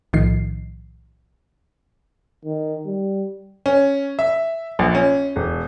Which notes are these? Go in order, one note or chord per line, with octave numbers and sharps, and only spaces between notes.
B1 A2 D#3 F3 C7
D#3
G3
C#4
E5
A#1
C#4
E1